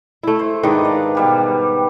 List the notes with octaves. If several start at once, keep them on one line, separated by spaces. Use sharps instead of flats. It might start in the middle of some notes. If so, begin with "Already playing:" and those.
A3 E4
C5
G#2 D#3 D4 B4 D#5
D5 F5
B2 G3 G4